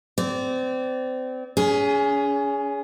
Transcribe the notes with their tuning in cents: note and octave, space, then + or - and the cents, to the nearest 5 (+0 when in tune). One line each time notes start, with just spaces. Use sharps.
C4 -30 D5 -20
C#4 +35 G#4 +0